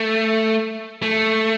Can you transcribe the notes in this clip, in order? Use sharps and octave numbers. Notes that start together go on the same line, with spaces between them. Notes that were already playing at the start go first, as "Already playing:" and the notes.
Already playing: A3
A3